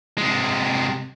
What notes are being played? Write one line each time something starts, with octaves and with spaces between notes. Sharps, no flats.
C3 G#3